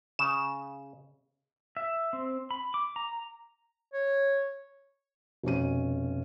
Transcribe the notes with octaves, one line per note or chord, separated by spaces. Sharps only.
C#3 E7
E5
C4
B5
D6
A#5
C#5
F1 B2 C#4 D#7